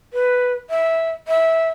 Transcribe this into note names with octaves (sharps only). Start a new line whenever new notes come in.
B4
E5
E5